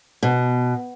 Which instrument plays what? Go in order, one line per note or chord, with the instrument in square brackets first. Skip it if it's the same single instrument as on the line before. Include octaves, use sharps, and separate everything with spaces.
[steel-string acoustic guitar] B2